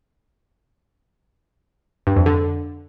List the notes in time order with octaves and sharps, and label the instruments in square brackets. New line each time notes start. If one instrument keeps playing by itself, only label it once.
[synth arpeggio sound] G2
F2
D3